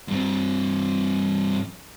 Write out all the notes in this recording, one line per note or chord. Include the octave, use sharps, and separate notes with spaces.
G2 C4